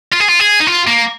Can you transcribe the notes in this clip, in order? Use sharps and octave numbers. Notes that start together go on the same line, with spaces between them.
F4
G#4
F4
G#4
D#4
F4
A#3